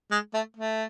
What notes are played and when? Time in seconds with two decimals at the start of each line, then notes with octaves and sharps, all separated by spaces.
0.11 G#3
0.34 A3
0.57 A3